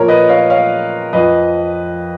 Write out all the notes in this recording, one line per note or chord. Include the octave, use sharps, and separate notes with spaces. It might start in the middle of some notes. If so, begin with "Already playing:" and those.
Already playing: A#2 F3 A#4 C#5
B4 D#5
C#5 F5
C#5 F5
F2 F3 B4 D#5